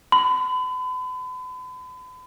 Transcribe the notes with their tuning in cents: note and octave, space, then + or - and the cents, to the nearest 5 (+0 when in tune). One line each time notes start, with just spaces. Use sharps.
B5 +40